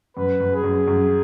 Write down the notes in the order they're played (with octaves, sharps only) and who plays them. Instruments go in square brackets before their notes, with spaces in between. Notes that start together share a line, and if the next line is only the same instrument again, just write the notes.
[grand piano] F#2 [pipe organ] B4
[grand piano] F#2
[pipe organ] G#4
[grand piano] F#2
F#2